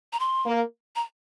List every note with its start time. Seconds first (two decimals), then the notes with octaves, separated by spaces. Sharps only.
0.13 A#5
0.20 C6
0.45 A#3
0.96 A#5